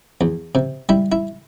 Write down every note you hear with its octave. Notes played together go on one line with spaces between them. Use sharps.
E2
C3
G3 E4
E4